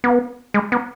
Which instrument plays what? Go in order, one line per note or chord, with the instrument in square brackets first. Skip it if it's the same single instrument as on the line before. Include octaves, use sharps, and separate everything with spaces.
[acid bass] B3
G#3
B3